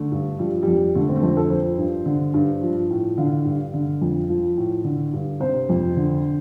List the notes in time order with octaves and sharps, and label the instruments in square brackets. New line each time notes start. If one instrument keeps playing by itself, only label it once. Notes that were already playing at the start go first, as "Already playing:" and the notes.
Already playing: [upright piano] D3 A3
G2
F3 G3
F2 G3
D3 A3
C4
A3
F2 C4
A4
F3 C5
G2
D3
G2
F3
A2
D3 F5
G2
D3
F2
F3
A2
D3
G2
C3 C5
F2
D3